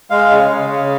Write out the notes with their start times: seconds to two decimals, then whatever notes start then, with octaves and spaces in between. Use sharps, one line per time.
0.10 G#3 F5
0.31 C#3
0.51 C#3
0.70 C#3